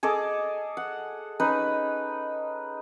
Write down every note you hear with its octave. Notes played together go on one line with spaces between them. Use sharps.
G#4 A4 D#5 D6
F#5
C#4 D#4 B4